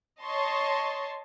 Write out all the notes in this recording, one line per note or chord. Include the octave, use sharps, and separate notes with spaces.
C#5 D#5 A5 C6 C#6